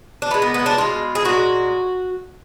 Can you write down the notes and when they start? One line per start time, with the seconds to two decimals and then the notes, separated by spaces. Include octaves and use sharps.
0.22 D4
0.30 A#2 B3
0.34 G#3
0.42 B3
0.54 B3
0.66 D4
0.77 B2 G#3 F4
1.15 G#4
1.24 A#2 G#3 F#4